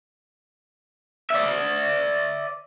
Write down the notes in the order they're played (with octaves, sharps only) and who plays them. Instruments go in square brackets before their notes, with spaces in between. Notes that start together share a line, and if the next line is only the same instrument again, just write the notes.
[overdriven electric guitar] D5 E5